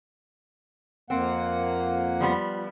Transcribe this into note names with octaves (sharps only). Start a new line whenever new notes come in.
F2 A#3 C4 F#5
F3 G3 B3